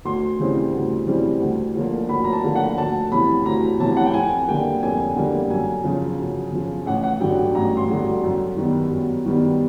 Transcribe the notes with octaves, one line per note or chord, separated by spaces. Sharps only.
D2 C6
C#3 E3 G3 C4
D2
C#3 E3 G3 C4
D2
D3 F3 A#3
D2 B5
A#5
A5
D3 F3 A#3
F#5
D2 A5
C3 E3 B5
D2 A#5
C3 E3 A5
F#5
G5
F2 G#5
D3 G3 A#3 G5
F2 G#5
D3 G3 A#3
F#2 G#5
C#3 F3
F#2
C#3 F3
A1 F#5
F#5
G2 D3 F#3 G5
A1 A#5
C6
G2 D3 F#3
F#2
D#3 G3 B3
F#2
D#3 G3 B3